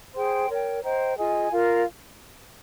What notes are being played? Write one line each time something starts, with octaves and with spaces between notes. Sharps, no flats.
G#4 C5 G5 C6
A#4 C#5 G5
C5 D#5 G5 A#5
F4 G#4 D#5 G#5
F4 A#4 F5